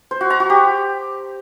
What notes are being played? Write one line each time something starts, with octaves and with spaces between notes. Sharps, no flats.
C5
F#4
A#5
F#4
G4